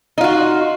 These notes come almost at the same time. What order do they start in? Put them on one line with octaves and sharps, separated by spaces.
D#4 F4 F#4